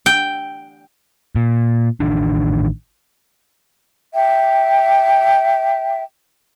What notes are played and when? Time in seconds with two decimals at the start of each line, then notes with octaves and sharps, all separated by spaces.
0.06 G5
1.35 A#2
2.00 A1 D#3 D4
4.13 E5 G5